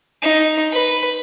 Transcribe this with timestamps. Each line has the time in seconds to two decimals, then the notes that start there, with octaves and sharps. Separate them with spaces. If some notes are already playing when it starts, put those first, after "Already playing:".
0.22 D#4
0.73 B4